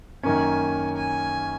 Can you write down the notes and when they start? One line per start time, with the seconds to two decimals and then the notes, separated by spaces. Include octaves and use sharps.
0.23 F#2 D#3 A#3 C#4 G#5
0.96 G#5